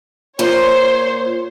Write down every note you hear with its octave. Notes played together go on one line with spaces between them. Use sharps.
A#2 C5 C#5